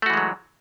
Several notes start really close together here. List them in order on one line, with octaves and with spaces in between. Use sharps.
A3 F#4 E3 G#3 F#3